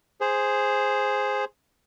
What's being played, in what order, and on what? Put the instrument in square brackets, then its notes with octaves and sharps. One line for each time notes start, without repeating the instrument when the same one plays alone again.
[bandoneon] G#4 C5